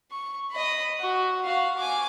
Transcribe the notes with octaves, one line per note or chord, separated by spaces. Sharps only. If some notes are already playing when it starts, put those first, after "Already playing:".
C#6
D#5 B5
F#4
F#4 F5
G#5 D6